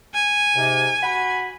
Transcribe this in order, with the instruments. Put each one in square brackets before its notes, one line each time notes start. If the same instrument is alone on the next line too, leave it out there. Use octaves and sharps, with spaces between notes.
[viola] G#5
[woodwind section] G#2 C3
F#4 F#5 B5